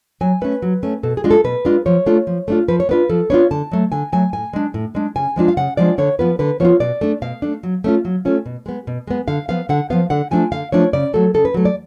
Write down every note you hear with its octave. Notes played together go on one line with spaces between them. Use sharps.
F#3 G#5
A3 C#4 B4
F#3
A3 C#4
B2 A4
G#4
G#3 D4 F4
A4
B2 B4
G#3 D4 F4
F3 C#5
A3 D4 F4
F3
A3 D4 F4
F3 B4
C#5
B3 D4 F4 B4
F3 A4
B3 D4 F4 C#5
D3 A5
F#3 A3
D3 G#5
F#3 A3 G#5
A2 G#5
G#3 D4
A2
G#3 D4
C#3 G#5
F3 G#3 D4 F4
F5
C#3 F#5
F3 G#3 D4 F4 D5
D3 C#5
F3 B3 F4 B4
D3 B4
F3 B3 F4 C#5
B2 D5
A3 D4
B2 F5
A3 D4
F#3
A3 C#4 F4
F#3
A3 C#4 F4
B2
G#3 B3
B2
G#3 B3
D3 F5
F3 B3 F5
D3 F#5
F3 B3 F5
D3 F#5
F3 A3 D4 F4 G#5
D3 F5
F3 A3 D4 F4 C#5
C#3 D5
F#3 A3 A4
C#3 A4
B4
F#3 A3
D5